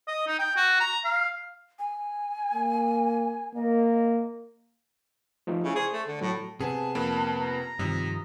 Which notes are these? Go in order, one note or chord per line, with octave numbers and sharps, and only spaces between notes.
D#5
D#4
G5
F#4
A#5
F5
G#5
A#3
A#3 D#5
F3 A3 D#4
C#3 E4
G#4 C5 C#6
A3
D3
A2 F#3
C3 B3 C4 G#4 A5
F2 A#3 B4
A#5
G2 C3 D#3 F3 D#6